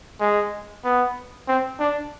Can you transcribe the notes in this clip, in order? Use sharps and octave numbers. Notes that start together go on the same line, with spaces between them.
G#3
B3
C4
D4